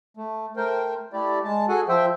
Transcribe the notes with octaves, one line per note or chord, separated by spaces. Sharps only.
A3
A3 A#4 C5 G5
A3 E4 G4 D5
G#3 A5
F#4 G#4 A4 F#5 G#5
F3 C5 E5 G5